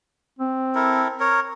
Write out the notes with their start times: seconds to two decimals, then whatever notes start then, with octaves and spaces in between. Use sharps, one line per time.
0.39 C4
0.75 E4 A4 A#4
1.20 A#4 C#5